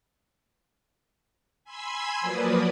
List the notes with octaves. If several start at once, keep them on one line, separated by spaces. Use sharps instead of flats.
G#5 B5 C6 E6 G#6
F3 F#3 A#3 B4 D5 D#6